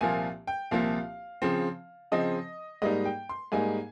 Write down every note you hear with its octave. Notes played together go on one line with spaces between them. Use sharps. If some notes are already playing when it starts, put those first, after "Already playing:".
C2 A#2 F3 A#3 F4 G#5
G5
C2 A#2 F3 A#3 F4 F5
C#3 F3 C4
C#3 F3 C4 D#5
G#2 G3 A#3 D#4 D#5
G5
C6
G#2 G3 A#3 D#4 G#5